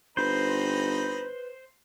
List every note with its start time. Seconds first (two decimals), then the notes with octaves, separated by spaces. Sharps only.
0.17 G1 C4 D#4 B4 C5 B5